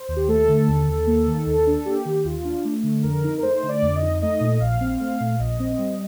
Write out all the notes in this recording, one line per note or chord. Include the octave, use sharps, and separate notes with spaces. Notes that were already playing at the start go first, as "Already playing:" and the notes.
Already playing: C5
D#2
G4
A3 A4
D3
D#2
D#2
A#3
D#3
D#2
D4
A#3 G4
D#3
D#2 F4
D4
A3
D3
F2 A#4
D#4
A#4
A3 C5
D3
D5
F2
D#5
D#4
A3 D#5
A#2
A#1 F5
C4
A3 F5
A#2
A#1 D#5
C4
G3